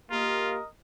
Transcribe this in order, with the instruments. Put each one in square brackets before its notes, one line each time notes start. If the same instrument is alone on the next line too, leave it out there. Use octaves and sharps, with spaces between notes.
[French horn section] A#3 G4 [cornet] F4 [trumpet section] A#4 D#5